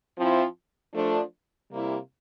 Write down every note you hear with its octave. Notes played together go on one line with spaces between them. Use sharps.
F3 C4 E4
F3 A3 D4
C3 G3 A#3 E4